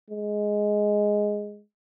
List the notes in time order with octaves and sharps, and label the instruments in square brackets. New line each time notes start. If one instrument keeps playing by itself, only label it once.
[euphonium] G#3